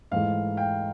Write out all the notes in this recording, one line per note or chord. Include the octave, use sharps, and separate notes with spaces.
G#2 E3 A3 F5
F5 G5